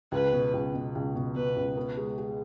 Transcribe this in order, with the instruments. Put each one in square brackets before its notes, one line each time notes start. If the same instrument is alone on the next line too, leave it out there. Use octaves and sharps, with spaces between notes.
[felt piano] C#2 [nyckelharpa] B4
[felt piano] B2
C#2
B2
C#2
B2
[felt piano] B2 [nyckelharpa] B4
[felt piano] C#2
B3
G#3
G#3